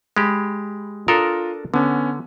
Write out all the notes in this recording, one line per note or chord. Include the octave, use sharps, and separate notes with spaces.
G#3 G4 B5
D4 F4 A4 A#4 A#5 D#6
D3 B3 C#4